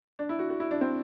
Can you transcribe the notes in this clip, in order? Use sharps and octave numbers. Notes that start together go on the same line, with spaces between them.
D4
E4
F#4
F#4
E4
D4
C4